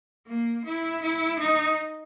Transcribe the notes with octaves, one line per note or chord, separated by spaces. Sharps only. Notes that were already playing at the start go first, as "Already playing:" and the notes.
A#3
E4
E4
D#4